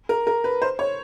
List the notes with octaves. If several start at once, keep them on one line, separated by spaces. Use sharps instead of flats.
A#4
A#4
B4
C5
C#5